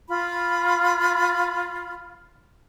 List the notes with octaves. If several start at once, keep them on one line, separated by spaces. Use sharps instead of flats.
F4 B5